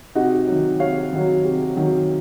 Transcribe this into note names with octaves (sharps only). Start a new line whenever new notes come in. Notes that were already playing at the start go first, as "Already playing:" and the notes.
C3 D#4 F#4
D#3 F#3
C3 C#5 F5
D#3 F#3
C3
D#3 F#3